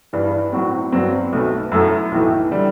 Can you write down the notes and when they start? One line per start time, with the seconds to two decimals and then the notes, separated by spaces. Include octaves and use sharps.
0.13 G2 E3 G3
0.52 A2 F#3 C4 F#4
0.92 G2 F#3 C4
1.33 B1 B2 A3
1.72 F#2 F#3 A3 E4 A4
2.12 B1 A2 E3 A3
2.51 D3 G3